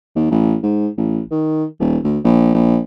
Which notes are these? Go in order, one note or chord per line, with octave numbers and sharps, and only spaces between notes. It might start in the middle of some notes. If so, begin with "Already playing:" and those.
D#2
A1
G#2
A1
D#3
D#1
D2
A#1
A#1